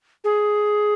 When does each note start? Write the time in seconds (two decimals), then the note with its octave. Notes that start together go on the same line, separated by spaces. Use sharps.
0.24 G#4